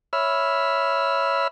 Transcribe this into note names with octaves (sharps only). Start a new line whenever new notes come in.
C#5 E5 B5 E6 F6